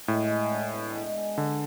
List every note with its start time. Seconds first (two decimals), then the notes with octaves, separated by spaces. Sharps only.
0.08 A2 G#3
0.30 G#4
0.51 D4
0.73 B2
0.94 G#3
1.17 G#4
1.38 D3 D4